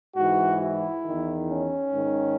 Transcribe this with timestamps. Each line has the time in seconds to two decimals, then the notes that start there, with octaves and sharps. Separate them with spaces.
0.16 G#2 E3 F#4
0.60 E4
1.04 E2 D#3
1.48 C#4
1.93 G#2 D#3